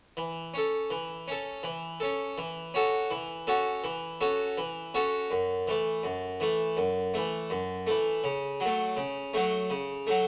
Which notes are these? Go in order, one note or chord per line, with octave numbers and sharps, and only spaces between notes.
E3
C#4 A4
E3
C#4 A4
E3
C#4 A4
E3
C#4 F#4 A4
E3
C#4 F#4 A4
E3
C#4 F#4 A4
E3
C#4 F#4 A4
F#2
E3 A3
F#2
E3 A3
F#2
E3 A3
F#2
E3 A3
C#3
F#3
A3
C#3
F#3 A3
C#3
F#3 A3